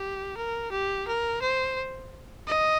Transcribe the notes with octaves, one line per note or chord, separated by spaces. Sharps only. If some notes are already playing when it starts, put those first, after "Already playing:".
Already playing: G4
A#4
G4
A#4
C5
D#5